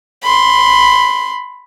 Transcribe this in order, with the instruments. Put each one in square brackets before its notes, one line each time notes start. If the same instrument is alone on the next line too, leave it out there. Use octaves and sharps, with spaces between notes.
[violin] B5 C6